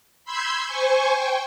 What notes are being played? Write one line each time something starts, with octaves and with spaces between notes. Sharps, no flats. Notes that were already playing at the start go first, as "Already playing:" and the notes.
B5 C6 E6 G6 G#6
C5 G#5 C#6
G5